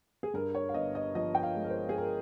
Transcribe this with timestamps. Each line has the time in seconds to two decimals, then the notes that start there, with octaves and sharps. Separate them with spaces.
0.23 G#4
0.34 G2 A#4
0.55 C#5
0.69 F5
0.74 G1 D#5
0.95 D#5
1.15 F3 D#5
1.35 G5
1.43 F5
1.56 G#3
1.64 A#4
1.70 C5
1.89 G#4
1.98 A#4